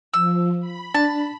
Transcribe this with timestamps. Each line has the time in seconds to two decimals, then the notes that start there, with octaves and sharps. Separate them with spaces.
0.14 F3 E6
0.60 B5
0.95 D4 A5